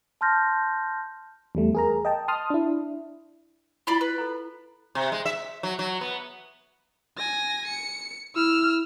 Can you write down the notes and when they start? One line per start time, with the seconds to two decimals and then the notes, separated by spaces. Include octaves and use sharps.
0.21 A5 C6 F6 G6 A#6
1.55 E2 G3 A3
1.75 G#4 A#4 A#5
2.05 D#5 G5 A5
2.28 A5 C6 D#6 F6
2.50 D4 E4
3.87 E4 F4 D5 B5 C6
4.01 B4
4.18 A4 A#5
4.95 C3
5.12 G#3
5.25 E5
5.63 F#3
5.79 F#3
6.01 B3
7.18 G#5 A#6
7.68 C#7
8.36 E4 E6 F6